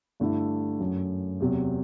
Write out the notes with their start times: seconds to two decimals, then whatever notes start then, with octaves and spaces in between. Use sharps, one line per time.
0.20 G2 D3 A3 E4
0.80 F#2 F#3 A3
1.40 E2 C3 F#3